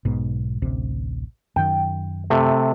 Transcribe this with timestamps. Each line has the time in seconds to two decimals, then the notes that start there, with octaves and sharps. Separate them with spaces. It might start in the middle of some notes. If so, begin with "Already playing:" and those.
0.05 B1 G#2 B2
0.62 A1 D2 C3
1.56 F#2 D#3 G5
2.30 C3 A3